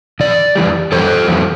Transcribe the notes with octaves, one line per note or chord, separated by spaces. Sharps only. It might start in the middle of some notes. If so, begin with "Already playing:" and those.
F2 E3 D5
F2 E3 G3
F2 E3 G3 A4 C5
F2 E3 G3